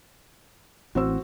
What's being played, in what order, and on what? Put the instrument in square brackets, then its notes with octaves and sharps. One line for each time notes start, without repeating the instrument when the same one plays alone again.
[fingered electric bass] A1 E3 C4 [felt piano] F#4 C5 E6